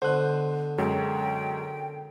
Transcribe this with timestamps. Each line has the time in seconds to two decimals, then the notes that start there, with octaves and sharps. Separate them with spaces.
0.02 B2 D3 C5 F#6
0.78 F#2 F#3 G#3 G5